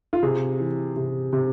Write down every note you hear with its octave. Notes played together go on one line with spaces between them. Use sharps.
F4
C3 G#4
E3
C3
C3